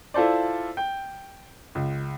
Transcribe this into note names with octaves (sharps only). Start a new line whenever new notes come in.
E4 F4 A4 C5 D5
G5
C#2